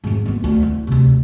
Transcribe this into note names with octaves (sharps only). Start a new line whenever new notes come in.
F2 G#2
A#3 B3
D2
E4
D2 C3